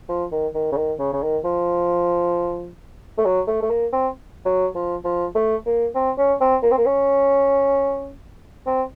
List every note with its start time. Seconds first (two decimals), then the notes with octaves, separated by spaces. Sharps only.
0.09 F3
0.31 D#3
0.54 D#3
0.72 C#3
0.77 D#3
0.99 C#3
1.13 C#3
1.22 D#3
1.44 F3
3.18 A3
3.25 F#3
3.47 A3
3.62 A3
3.70 A#3
3.92 C4
4.45 F#3
4.75 F3
5.04 F3
5.35 A3
5.66 A#3
5.95 C4
6.18 C#4
6.40 C4
6.62 A#3
6.71 C4
6.78 A#3
6.86 C#4
8.66 C4